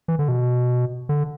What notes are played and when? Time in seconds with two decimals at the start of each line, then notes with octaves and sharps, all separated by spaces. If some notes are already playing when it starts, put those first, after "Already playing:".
0.08 E3
0.19 D3
0.28 B2
1.09 D3